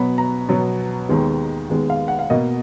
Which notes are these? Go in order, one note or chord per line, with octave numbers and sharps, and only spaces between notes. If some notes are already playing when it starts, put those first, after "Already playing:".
Already playing: B2 F#3 B3 B5
A#5
B2 F#3 B3
D#2 D#3 G#3 B3
D#2 D#3 G#3 B3
F5
F#5
F5
B2 A#3 D#5